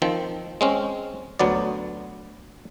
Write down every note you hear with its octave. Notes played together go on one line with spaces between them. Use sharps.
D#3 F3 C4
G#3 C4 C#4
D2 F#3 B3 D5